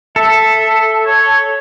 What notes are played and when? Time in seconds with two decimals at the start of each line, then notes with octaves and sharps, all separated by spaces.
0.16 A4 E5
1.07 C#5